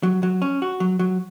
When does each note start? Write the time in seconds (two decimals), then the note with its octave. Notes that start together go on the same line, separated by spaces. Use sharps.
0.03 F#3
0.23 F#3
0.42 C#4
0.62 F#4
0.80 F#3
0.99 F#3